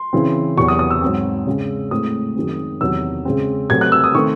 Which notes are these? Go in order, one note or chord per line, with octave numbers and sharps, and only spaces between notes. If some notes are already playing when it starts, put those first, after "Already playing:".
Already playing: C6
C#3 E3 C4
E2 C3 F#3 C#6
D#6
D#6
E6
G#2 F#3 C4
C#3 G#3 C4
A2 G#3 C4 D#6
F#2 D#3 G#3 C4
E2 C3 D#3 F#3 E6
C#3 G#3 C4
C3 F#3 A3 C4 G#6
F#6
E6
D#6
D#3 A3 C4 C#6